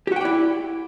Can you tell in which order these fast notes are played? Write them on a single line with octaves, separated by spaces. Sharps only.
G4 F#4 G5 D5 E4